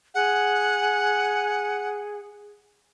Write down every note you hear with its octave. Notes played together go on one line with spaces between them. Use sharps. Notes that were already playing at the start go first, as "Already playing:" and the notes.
G#4 F#5